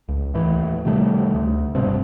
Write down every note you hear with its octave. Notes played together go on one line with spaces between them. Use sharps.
C#2
D#2 A2 E3
C3 D#3 G3 A3
D2
F1 G2 B2 C4